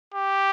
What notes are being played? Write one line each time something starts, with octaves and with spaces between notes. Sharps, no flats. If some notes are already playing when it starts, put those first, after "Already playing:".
G4